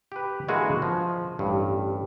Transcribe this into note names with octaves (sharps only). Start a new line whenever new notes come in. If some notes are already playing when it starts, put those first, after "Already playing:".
G4 B4
D3 E3 G#3 A#3 F#4 G#4
F3
A1 G2